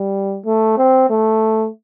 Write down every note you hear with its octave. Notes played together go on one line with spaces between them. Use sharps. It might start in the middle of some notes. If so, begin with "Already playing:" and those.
Already playing: G3
A3
C4
A3